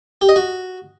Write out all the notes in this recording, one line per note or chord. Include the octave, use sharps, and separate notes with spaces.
G4
D#5
F#4